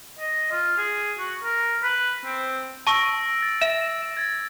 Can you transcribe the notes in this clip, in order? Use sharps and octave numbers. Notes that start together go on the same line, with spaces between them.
D#5
F4
G#4
F#4
A#4
B4
C4
A5 C#6 E6 A#6 D7
A6
E5 E7
G#6 A6